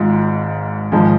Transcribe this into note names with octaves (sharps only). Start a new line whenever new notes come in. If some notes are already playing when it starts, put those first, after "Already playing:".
Already playing: G#1 G#2 G#3 F4
G#1 G#2 F3 G#3